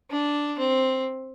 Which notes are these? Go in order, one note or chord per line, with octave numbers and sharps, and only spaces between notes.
D4
C4